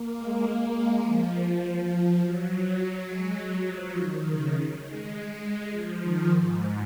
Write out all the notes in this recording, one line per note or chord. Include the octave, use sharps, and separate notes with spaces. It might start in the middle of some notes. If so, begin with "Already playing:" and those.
Already playing: A#3
G#3
A#3
G#3
F3
F3
F3
F#3
G#3
F#3
F3
D#3
C#3
G#3
G#3
F3
D#3
G#2